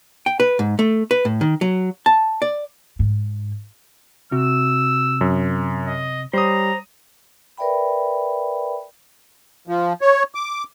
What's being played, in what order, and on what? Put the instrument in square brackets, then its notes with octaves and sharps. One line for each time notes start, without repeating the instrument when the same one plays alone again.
[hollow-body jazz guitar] G5
B4
G#2
A3
B4
A2
D#3
F#3
A5
D5
[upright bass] G#2
[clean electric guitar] C3 [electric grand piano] F#4 [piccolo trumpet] E6
[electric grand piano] F#2
[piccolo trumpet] D#5
[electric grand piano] G3 C#5 D#6 [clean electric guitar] C5 [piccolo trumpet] A#5
[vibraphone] A#4 B4 D5 E5 G5 B5
[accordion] F3
C#5
D6